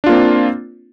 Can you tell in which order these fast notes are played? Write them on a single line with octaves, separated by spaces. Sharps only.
D4 F4 A#3 C4